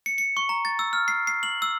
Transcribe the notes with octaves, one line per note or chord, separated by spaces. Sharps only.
C#7
C#7
C#6
A#5
A6
E6
F6
C7
C7
F#7
E6